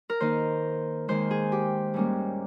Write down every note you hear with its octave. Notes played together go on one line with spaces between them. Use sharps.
A#4
D#3 A#3 D#4 C5
D#2 D#3 G#3 C5
G#4
G4
G#2 G3 A#3 C#4